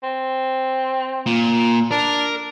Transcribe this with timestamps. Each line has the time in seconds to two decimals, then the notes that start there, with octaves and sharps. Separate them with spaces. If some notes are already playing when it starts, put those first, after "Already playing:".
0.03 C4
1.26 A#2
1.91 D4 A#4